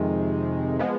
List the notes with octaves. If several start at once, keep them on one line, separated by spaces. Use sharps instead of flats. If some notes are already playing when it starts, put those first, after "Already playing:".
Already playing: F2 C3 D#3 G#3
F3 G#3 B3